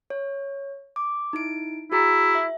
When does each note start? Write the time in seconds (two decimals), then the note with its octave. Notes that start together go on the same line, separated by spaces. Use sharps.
0.10 C#5
0.96 D6
1.33 D#4 E4 D7
1.92 E4 F#4 G#4 A#5
2.35 E5